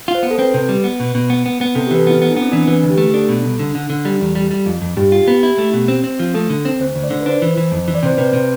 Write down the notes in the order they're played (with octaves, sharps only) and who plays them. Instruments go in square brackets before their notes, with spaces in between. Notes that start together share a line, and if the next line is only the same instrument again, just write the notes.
[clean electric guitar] F4
[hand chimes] C5
[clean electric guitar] B3
[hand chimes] A4
[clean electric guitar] C4 [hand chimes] B4
[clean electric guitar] C3
G3
B3
B2
B2
B3
B3
B3
[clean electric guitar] C3 [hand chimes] A4
[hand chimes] G4
[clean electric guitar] E3 [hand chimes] B4
[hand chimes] A4
[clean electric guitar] B3 [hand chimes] E4
[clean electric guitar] B3 [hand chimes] E4
[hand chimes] D4
[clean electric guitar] B3
[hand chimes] C4
[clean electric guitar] E3 [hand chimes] D4
[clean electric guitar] E3 [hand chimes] B4
[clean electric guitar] D2
[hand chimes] G4
[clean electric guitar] A3
[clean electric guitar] D4 [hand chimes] A4
[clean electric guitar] B2
C2
D3
D3
D3
[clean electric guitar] G3 [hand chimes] A4
[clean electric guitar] E2
G3
G3
F2
F2
[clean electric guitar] G2 [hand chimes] G4
[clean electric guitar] F4
B3
E4
A3
B2
C4
C4
F3
[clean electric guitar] A3 [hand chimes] A4
[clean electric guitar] D3
C4
[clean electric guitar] D2 [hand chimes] C5
[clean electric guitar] D2
[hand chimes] D5
[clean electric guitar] D3
[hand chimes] B4
[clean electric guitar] D4 [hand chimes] C5
[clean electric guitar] E3
E3
F2
E3
[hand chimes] D5
[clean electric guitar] C3 [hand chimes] C5
[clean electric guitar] C3 [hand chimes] B4
[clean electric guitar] C3